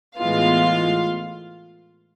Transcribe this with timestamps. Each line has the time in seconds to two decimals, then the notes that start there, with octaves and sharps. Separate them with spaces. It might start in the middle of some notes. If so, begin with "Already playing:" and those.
0.17 A2 E3 G#3 B3 F4 F5